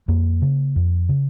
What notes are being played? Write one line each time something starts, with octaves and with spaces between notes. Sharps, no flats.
F2 A#3
C#3
F2
C#3